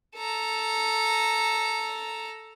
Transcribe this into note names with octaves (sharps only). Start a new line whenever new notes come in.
A4 A#5